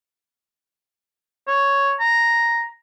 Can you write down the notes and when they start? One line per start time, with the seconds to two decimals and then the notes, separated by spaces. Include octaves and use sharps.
1.48 C#5
2.00 A#5